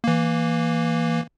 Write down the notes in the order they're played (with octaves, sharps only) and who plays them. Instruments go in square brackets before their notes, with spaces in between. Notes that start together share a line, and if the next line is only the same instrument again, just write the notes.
[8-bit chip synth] E3 A#3